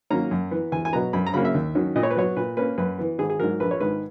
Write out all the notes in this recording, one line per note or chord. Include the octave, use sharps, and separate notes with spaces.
D#3 F#3 A#3 C#4 A#5
F#2
E3 B3
E2 G#5
G#5
B2 F#3 B3 A#5
F#2 B5
A#5
C#3 F#3 A#3 C#4 B5
E5
D#2
D#3 F#3 C#4
A#2 D#5
C#5
B4
F#3 B3 C#5
A#2 B4
A#3 C#4 B4
F#2 B4
E3 B3
G#1 G#4
G#4
G#2 F#3 A#4
A#1 B4
C#5
G#2 D#3 B4